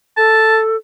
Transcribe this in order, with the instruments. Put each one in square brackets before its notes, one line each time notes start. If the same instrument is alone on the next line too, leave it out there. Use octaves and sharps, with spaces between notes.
[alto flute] A4 [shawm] A5